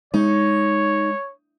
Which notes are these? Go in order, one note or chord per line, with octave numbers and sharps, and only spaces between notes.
G#3 D#4 C#5